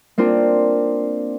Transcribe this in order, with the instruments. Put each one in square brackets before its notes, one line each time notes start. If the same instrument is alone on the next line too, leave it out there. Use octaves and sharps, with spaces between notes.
[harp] A#3 C4 D4 F4